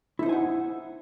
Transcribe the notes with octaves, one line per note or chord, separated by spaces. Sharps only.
D#4 E4 C5 F#5 G#5